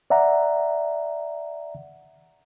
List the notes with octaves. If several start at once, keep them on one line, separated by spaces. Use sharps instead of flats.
D5 E5 F#5 A#5